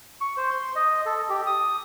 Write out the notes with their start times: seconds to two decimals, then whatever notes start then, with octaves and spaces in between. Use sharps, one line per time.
0.21 C#6
0.37 C5
0.51 C6
0.76 D#5
1.06 A4
1.30 G4
1.47 D#6